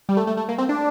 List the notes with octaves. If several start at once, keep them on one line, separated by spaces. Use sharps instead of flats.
G3
A3
A3
A3
A#3
C4
D4